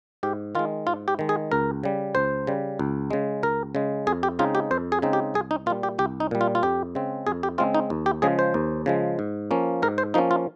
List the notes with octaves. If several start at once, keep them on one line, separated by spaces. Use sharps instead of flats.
G#2 G4
D#3 G#3 F4
G#2 F4
G4
D#3 G#3
G#4
C#2 A#4
C#3 G3
C#2 C5
C#3 G3
C#2
C#3 G#3
C#2 A#4
C#3 G#3
F2 G#4
G4
C#3 G#3 C4 D#4 F4
G4
F2 C5
G#4
C#3 G#3 C4 D#4
G4
C2 G#4
D#4
A#2 G3 F4
G4
C2 G4
D#4
A#2 G3
F4
F4
F2 G4
C#3 G#3 C4
F2 G#4
G4
C#3 G#3 C4 F4
D#4
D#2
G4
C#3 F3 G#3 G#4
C5
D#2
C#3 F3 G#3
G#2
F3 A#3 C#4
G#2 A#4
C5
F3 A#3 C#4 D#4
F4